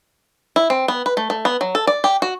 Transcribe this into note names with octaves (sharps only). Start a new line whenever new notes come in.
E4
C4
B3
B4
A3
A3
B3
F#3
A4
D5
G4
F#4